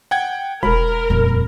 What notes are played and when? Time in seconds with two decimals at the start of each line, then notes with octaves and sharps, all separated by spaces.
0.11 F#5 G5 G#6
0.63 E1 A#4 B5
1.10 D#1 F2